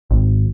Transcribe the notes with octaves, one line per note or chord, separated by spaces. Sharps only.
G#1